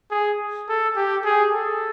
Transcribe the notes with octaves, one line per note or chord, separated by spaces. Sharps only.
G#4
A4
G4
G#4
A4